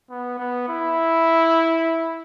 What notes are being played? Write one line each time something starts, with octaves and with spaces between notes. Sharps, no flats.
B3
B3
E4